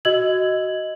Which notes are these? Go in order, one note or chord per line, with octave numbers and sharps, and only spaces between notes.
F#4 D#5 E6 G#6 F#7